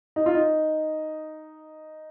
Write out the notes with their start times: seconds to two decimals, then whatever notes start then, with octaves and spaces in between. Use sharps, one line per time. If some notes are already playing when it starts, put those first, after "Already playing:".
0.16 D#4
0.26 F4
0.35 D#4